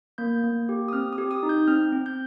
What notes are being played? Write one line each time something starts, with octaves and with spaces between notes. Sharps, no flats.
A#3 G6
A#3
G4
D#6
C4 F6
D#6
G4
D#6
D#4
G6
C4 F6
C4
G6